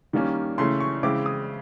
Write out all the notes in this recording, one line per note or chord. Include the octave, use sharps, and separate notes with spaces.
D#3 G3 A#3 C#4
C#3 E3 A3 C#4 C6
C#6
C#3 E3 G#3 C4 E4 D6
D#6